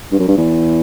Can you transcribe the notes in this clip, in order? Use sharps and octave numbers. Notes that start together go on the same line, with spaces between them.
G2
F#2
G2
E2